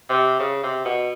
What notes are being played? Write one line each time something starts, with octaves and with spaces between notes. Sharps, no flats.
C3
C#3
C3
B2